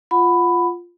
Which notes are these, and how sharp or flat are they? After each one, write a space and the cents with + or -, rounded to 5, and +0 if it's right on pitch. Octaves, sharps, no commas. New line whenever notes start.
F4 +0 F#5 -15 B5 +10